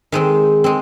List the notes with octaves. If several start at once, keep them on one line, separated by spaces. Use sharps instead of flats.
D#3 G#3 C4
G#3 C4